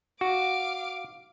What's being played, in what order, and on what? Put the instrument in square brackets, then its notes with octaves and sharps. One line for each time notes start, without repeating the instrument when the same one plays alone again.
[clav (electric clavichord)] F#4 [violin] F5 D6